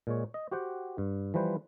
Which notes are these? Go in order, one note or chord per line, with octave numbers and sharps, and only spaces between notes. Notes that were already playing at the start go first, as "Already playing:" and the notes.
A#2 G#3 C#5
D#5
F#4 G4 C5 F#5 G5
G2
E3 F3 G3 B4 C5